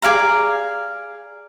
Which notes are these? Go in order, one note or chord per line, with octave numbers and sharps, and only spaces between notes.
G#4 D5 F5 A#5